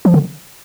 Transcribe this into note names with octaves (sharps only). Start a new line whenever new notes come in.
F3
D3